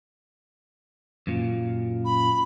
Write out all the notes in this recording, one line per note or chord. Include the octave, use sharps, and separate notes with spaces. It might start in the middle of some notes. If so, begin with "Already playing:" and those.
F#2 A#2
B5